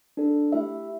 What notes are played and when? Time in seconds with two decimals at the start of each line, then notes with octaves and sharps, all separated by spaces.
0.17 D4 A4
0.52 A3 E4 G4 E5